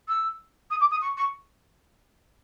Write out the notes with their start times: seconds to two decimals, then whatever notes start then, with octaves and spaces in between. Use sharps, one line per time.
0.08 E6
0.71 D#6
0.81 D6
0.91 D#6
1.02 C#6
1.17 C#6